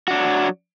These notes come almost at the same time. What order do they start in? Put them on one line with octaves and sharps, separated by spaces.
F#4 D4 F#3